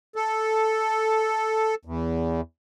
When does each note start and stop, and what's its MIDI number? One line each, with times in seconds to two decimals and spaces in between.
0.16 1.75 69
1.85 2.41 40